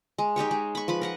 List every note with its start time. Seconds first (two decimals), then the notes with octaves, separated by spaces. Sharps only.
0.18 G#3
0.36 D#4 G4 G#4 C#5
0.51 G#3
0.75 B5 C#6
0.88 F3 B4 B5
1.02 A#4 B4 F#5